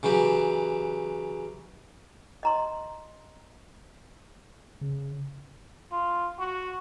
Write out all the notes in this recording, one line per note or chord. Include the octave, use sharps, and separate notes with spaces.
C#3 E3 F#3 G4
D#5 A#5 C6
C#3
F4
F#4